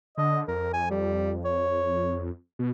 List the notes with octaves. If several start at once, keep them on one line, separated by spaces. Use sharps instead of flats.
D3 D#5
F2 A#4
G#5
G3
C#5
B2